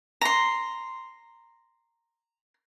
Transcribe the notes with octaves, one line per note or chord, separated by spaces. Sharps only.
A#5 C6